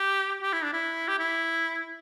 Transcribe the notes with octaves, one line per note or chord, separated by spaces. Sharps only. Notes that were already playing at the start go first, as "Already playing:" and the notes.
Already playing: G4
G4
E4
D4
E4
G4
E4